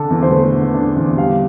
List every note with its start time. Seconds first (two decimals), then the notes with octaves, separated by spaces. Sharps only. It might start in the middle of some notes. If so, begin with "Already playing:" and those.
Already playing: D3 D4 A4
0.10 E2
0.23 C5
0.31 A3 B4
0.52 D3
0.74 D4
0.96 E2
1.17 G3 F5